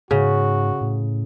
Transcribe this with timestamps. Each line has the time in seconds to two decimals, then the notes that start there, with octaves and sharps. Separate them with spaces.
0.11 G#2 C#3 F#4
0.81 A2